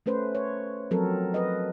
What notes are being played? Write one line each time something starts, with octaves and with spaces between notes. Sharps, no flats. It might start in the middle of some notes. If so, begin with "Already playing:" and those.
A3 C#4 B4 C5
C#5
F3 F#3 C4 A4 A#4
B4 D#5